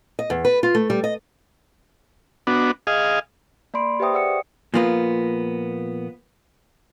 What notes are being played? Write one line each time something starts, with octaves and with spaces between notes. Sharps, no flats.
D#5
E2
B4
F4
A3
G3
D#5
B3 D4 F#4
G#4 D#5 F5
A#3 D5 B5 C6 D7
G4 B4 C5 E5 G5 D#6
G#4 D5 F#5 E6 C#7
A#2 F3 A#3 B3 F4